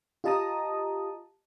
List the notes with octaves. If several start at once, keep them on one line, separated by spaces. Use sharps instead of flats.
F4 G4 D#5 A5 A#5 D#6